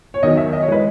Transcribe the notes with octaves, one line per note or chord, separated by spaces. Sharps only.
C#5
E2 D#3 F#3 D#5
E5
D#5
C#5
E3 G#3 B4